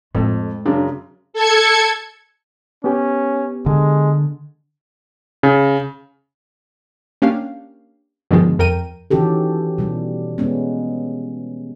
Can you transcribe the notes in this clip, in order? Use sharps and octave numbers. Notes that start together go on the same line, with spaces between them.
F2 A2 G#3 A3 A4
F#2 C#3 D4
A4 G#6 C#7
B3 C#4 G4
D3 G#3
C#3
A#3 C#4 D4 G4 F5
G2 B2 D3 D#3 F3 G#3
F2 A#4 G5 D#7
D#3 E3 C#4 F#4 G4 A4
B2 G3
G#3 B3 C#4